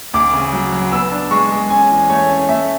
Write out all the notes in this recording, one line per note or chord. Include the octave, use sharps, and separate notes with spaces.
D2 D6
C#3
F#3
F#3
B3 E6
D4
G#3 C#6
G#3
C#4 G#5
E2
A3 C#5
C#4
A3 E5